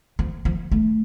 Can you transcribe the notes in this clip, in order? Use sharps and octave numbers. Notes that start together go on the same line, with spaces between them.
F3
F3
A3